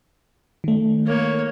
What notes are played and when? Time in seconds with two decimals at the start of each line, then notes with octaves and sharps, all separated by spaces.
0.64 D#3 A3
1.06 A#3 C#5